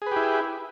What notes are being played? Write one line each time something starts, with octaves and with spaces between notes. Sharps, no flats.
E4 G4 G#4 B4